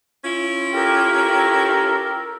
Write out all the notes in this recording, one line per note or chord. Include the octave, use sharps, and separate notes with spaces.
C#4 E4 F4
G4 A4 A#4